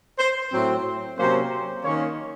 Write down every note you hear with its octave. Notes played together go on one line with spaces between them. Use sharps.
C5
A2 F#3 C4
C3 F#3 A#3 C#4 C5
D#3 A#3 C#4 C#5